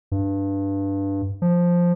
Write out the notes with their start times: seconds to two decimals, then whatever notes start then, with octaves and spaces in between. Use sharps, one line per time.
0.12 G2
1.42 F3